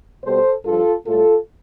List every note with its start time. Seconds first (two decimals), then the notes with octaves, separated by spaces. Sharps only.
0.24 B2 G3 A4 C5
0.65 G2 F3 F4 A4
1.06 A2 G3 F4 A4